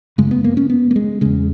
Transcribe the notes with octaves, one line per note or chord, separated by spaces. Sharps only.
F#2 C#3 G#3
B3
A#3
C#4
B3
A#3
G#3
E2 C#3 G#3